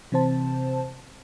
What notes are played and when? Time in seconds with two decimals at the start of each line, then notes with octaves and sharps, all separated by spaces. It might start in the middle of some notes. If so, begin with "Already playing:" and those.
0.12 C3 E3 C4 C5 A5